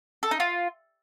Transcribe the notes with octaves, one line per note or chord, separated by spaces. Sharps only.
A4
D#4
F4